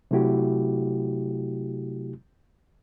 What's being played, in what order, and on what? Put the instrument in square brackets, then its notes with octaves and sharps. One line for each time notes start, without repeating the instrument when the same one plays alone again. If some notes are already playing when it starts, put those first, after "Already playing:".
[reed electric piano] C3 F#3 A3 E4 F#4 G4